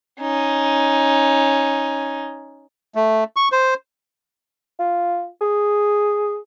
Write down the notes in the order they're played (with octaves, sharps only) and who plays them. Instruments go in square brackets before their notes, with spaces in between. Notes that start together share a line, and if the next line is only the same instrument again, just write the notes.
[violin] C#4 D#4
[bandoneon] A3
C#6
C5
[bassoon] F4
G#4